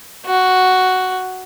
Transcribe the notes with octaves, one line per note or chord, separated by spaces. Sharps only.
F#4